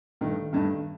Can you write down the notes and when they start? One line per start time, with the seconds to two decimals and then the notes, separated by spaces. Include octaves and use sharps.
0.21 G2 D#3 A3
0.53 G2 D#3 A3